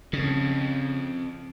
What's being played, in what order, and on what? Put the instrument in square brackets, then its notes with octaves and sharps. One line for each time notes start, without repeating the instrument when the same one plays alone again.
[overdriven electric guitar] F2 [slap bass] C#3